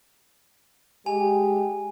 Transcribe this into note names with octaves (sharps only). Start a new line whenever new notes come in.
G#3 G4 G#5